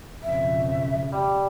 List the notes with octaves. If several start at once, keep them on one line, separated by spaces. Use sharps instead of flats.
B1 F2 C#3 E5
G3 G4